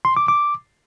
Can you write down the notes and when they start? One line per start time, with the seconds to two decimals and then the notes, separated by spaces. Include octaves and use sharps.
0.05 C6
0.17 D6
0.28 D6